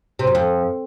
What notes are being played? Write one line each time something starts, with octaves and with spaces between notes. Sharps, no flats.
C3
F#2
F2